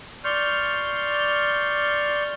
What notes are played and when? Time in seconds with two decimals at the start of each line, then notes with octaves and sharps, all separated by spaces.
0.25 D5 C6 C#6 F6 G6